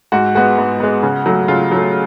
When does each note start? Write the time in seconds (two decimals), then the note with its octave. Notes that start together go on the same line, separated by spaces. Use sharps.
0.12 G#2 F#4
0.35 G#3 B3 F#4
0.58 G#2
0.80 G#3 B3
1.03 C#3
1.26 F#3 A3
1.48 C#3 F4
1.71 F#3 A3